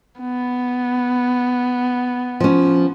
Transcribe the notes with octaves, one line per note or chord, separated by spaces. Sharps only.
B3
F3 C#4